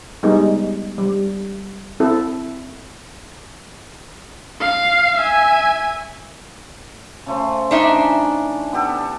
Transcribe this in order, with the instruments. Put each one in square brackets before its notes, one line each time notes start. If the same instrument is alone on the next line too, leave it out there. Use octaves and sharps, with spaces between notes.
[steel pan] G3 G#3 B3 D#4
G3
C4 E4 A4
[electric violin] F5
E5 G#5
[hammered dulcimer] C#3 A3 C5
[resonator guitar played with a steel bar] D4 D#4 E5
[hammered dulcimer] E3
B3 G4 A4